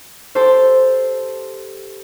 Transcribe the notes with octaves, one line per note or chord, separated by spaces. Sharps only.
G4 A4 C5